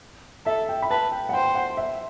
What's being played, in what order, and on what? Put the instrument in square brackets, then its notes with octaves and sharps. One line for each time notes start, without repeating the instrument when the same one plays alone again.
[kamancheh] A4 [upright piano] E5
[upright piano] G5
B5
[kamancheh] B4 [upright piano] A5
[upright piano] G5
F#5
[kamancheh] C5 [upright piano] G5
[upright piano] F#5
E5